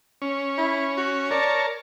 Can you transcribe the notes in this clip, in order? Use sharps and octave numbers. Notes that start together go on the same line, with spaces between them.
C#4
E4
F#4
A#4 C#5 D5 A5